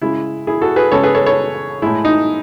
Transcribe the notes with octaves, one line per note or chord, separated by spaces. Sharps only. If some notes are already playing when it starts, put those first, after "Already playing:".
C#3 G#3 E4
E4 G#4
F#4 A4
G#4 B4
C#3 G#3 A4 C#5
G#4 B4
A4 C#5
A4 C#5
A2 G#3 E4
D#4